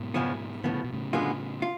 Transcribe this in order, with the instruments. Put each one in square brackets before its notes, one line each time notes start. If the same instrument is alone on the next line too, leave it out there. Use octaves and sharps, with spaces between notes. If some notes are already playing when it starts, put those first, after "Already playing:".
Already playing: [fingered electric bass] G#2 B2
[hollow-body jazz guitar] F2 C#3 F3 G#3 B3
[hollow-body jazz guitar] A2 F3 B3 [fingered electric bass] D3
[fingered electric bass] C#3
B2
A2 C#3
[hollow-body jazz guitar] F#2 D3 G#3 B3 F4
F4